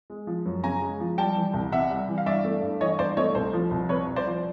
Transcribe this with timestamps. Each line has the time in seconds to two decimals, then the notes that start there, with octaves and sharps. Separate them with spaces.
0.10 G#3
0.27 F3
0.45 F#2
0.64 C#3 G#5 A#5
0.82 G#3
1.00 F3
1.18 G3 G5 A5
1.36 E3
1.54 C2
1.72 C3 E5 F#5
1.90 G3
2.08 E3
2.18 F5
2.26 G2 D5 E5
2.45 A3
2.63 G2
2.81 E3 C#5 D#5
2.99 G2 C5 D5
3.17 A3 C#5 D#5
3.35 C2 C5
3.53 F3
3.71 C2
3.89 C3 B4 C#5
4.07 C2
4.16 C5 D5
4.26 F3